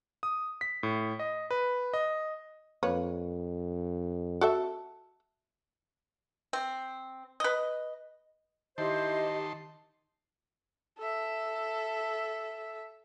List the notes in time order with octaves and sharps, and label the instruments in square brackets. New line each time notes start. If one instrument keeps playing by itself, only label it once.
[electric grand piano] D#6
B6
A2
D#5
B4
D#5
[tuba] F2 [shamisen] A#3 B4 C#5
[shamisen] F#4 A4 E5
[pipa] C4
B4 D#5
[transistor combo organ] D#3 A5 C6 [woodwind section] E4 C5 [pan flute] G4 [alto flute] D#5
[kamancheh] A4 E5